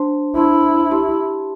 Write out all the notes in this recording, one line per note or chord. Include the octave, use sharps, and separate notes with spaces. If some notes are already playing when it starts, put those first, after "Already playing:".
Already playing: D4 C5 A5 C6
D4 E4 C5 A5 C6
G4 E5 A5 C6